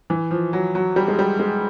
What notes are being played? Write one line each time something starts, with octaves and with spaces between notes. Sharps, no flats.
E3
F3
F#3
F#3
G3
G#3
G3
G#3